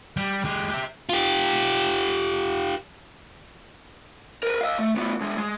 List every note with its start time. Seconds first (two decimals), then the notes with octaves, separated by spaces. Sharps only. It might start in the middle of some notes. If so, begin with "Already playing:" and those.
0.17 G3
0.45 G#3 G4
0.70 G4 E5
1.09 F4 G4
4.43 A#4 B4
4.61 D#5 F5
4.79 A3
4.96 A2 B3
5.21 B2 G#3
5.38 G#3